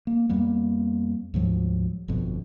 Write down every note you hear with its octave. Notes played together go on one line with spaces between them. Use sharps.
A#3
F2 G3 A#3 B3
D2 G#2 F3 F#3
G1 F2 B2